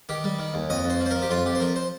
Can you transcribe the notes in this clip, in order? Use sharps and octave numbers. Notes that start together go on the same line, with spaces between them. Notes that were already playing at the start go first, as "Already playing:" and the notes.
D#3 G4
G3
D#3
D#2
F2 D#5
F2
C5
F3
C5
F3 A#4
G4
F2 F4
F2 G4
C5
F3 A#4
C5